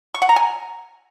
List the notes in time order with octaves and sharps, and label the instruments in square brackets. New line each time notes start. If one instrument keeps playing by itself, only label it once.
[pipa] C#6
F#5
A#5
G#5